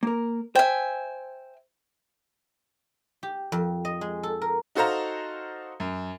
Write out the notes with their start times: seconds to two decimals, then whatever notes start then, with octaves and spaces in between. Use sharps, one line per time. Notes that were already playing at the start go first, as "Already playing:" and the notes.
0.03 A#3 A#4
0.55 C5 E5 G5 G#5
3.23 G4
3.52 F2
3.85 D#5
4.01 G#3
4.23 A4
4.42 A#4
4.75 D#4 F#4 A4 C5 F5 A#5
5.80 F#2